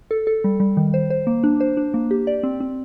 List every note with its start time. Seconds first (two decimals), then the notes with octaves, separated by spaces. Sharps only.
0.11 A4
0.27 A4
0.44 G3
0.60 G3
0.77 D#3
0.94 C5
1.10 C5
1.27 A#3
1.44 D4
1.60 C5
1.77 D4
1.94 A#3
2.11 G4
2.27 D5
2.43 C4
2.60 C4